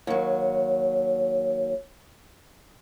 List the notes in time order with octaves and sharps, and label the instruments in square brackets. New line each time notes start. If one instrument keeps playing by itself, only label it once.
[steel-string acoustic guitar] D#2 F#3